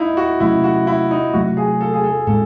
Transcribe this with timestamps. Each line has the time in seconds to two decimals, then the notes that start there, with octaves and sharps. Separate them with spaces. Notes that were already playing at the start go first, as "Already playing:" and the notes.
Already playing: D#4 E4
0.17 F#4
0.40 C3 F#3 A3 C#4 E4
0.64 F#4
0.87 E4
1.11 D#4
1.33 C3 F#3 A3 C4 F#4
1.57 G#4
1.81 A4
1.94 G#4
2.03 A4
2.27 A2 G#3 C4 A4